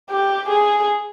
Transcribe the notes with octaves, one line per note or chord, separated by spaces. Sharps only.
G4
G#4